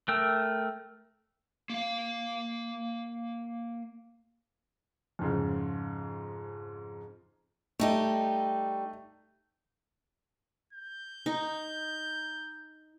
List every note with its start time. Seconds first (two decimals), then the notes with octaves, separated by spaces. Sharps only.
0.08 A3 A#4 G5 E6
1.70 A#3 F5
5.19 F2 G#2 C#3
7.80 G3 A3 D#4 G4
10.73 G6
11.26 D#4